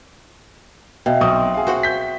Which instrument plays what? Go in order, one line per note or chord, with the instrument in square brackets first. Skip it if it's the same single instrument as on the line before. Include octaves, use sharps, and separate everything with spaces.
[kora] B2 [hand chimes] E5 G5 [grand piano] F5
[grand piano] B1 C#6 D#6 [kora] C4
[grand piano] G#4 F5
[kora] F#4 C5 F#5
[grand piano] G6 B6